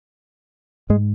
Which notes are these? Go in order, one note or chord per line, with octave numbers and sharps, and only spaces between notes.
G#2 G#3